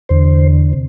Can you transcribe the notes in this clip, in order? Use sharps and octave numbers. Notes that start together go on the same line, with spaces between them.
E2 D3 C5
C3